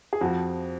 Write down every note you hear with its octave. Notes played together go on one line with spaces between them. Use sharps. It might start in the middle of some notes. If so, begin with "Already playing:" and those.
G#4
F2 F3 F#4